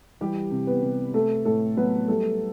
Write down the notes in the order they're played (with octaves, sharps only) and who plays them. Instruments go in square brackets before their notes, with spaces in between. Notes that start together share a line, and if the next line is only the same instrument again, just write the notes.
[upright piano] E3 G3 G4
C3
B3 B4
C3
A3 A4
A2 A3 A4
F#3 B3 B4
G3 A3 A4